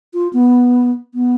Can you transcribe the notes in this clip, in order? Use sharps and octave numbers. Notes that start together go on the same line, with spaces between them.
F4
B3
B3